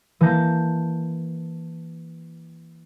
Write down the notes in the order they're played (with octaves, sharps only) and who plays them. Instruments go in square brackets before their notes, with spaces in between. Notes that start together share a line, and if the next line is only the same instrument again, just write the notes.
[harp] E3 A#3 A5 G6 A#6